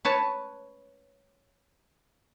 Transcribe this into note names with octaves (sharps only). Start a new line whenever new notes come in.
B4 C#5 A5